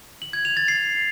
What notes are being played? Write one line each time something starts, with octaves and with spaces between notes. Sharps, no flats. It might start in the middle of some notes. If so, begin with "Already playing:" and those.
F#7
G#6
F7
A6
C7